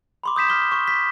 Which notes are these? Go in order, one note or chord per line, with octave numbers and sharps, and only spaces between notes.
B5 C6 D6
D#6 G6 B6 E7
F6 B6 G7
C#6
B6